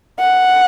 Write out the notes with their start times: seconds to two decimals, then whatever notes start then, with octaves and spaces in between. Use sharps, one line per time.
0.20 F#5